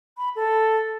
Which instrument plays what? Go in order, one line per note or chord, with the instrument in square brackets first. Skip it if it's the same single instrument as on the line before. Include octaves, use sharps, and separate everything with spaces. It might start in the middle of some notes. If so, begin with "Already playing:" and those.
[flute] B5
A4